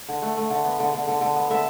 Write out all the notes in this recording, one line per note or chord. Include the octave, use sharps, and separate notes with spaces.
D3
A3 F#5
A3
D3
B3
D3
D3
D3
D3
B3
D3 E5